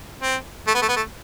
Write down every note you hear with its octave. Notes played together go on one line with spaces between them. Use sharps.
C4
A3
B3
A3
B3
A3